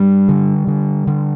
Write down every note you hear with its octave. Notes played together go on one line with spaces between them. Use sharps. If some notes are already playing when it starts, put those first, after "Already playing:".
Already playing: G2 G3
D3
D3
D3